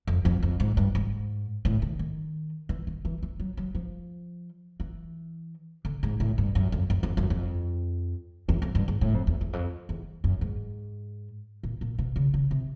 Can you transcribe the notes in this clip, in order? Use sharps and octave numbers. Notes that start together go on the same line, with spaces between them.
F2
F2
F2
G#2
G2
G#2
A2
D#3
D#3
E3
D#3
E3
E3
F#3
F#3
F3
E3
D3
G#2
A2
G2
F#2
F2
F#2
F2
F#2
F2
E2
F2
G2
G#2
A2
F2
E2
E2
F2
E2
F#2
G#2
A#2
A#2
B2
C#3
C#3
C3